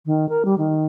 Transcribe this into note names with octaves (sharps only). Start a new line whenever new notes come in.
D#3
A#4
G3
D#3